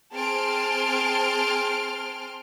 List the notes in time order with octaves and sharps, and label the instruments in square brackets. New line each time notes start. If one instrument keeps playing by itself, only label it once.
[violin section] C4 G#4 A5 C6 F6 D7